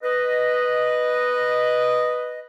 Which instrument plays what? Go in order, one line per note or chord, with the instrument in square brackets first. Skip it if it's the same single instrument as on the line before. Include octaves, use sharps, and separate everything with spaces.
[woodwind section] B4 D#5